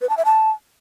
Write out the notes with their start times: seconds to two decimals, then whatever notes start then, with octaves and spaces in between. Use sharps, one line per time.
0.02 B4
0.09 A5
0.17 E5
0.25 A5